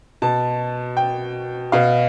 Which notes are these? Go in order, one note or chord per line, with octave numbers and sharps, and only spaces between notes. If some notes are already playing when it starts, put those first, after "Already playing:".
B2 A5
G5
B2 F5